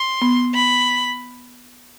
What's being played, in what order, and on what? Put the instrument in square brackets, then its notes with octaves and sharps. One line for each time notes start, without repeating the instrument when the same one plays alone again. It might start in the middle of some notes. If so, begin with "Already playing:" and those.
Already playing: [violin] C6
[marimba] B3
[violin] B5